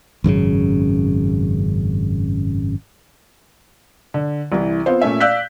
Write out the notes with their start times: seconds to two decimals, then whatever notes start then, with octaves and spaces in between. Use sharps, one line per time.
0.24 G#1 F#2 A2 C#3
4.14 D3
4.52 C2 E3
4.86 B3 C4 F4 C5
5.01 A#2 A3 C#4 E5
5.20 D5 F5 E6 F#6 G6 B6